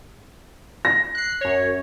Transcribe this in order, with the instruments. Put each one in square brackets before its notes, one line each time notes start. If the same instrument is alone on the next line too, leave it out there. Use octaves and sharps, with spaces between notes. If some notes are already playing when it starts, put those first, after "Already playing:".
[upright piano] A#6
[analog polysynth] F#6 C7
F#2 C#5